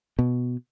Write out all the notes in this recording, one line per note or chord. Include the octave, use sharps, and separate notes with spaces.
B2